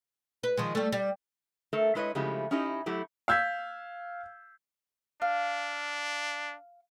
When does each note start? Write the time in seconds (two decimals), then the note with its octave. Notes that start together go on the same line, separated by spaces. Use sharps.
0.43 B4
0.57 D#3 F3 G#3
0.75 G3 A3
0.92 G3
1.73 A3 A4 A#4 E5
1.95 G#3 E4 B4 C#5 D#5
2.15 C#3 F3 G#3 A3 E4 G4
2.51 C#4 D#4 E4 G4 D#5
2.86 F#3 A3 E4 G4
3.28 F5 E6 G6 G#6 B6
5.22 D4 F5